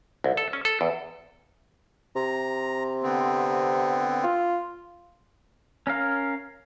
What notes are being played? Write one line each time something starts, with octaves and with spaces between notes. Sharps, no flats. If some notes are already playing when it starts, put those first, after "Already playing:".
C2
A4
C#4
A4
E2
C3 A#5
D3 B3 C4
F4
C#4 A#4 F5